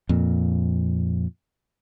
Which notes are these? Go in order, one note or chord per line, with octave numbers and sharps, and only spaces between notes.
F2 A#2